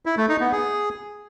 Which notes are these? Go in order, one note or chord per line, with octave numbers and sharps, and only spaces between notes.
E4
A3
D#4
B3
G#4